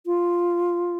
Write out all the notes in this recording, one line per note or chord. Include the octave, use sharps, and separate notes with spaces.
F4